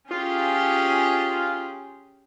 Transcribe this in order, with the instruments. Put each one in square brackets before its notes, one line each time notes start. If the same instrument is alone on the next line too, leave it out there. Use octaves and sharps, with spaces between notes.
[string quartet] C#4 G4 G#4 [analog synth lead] F4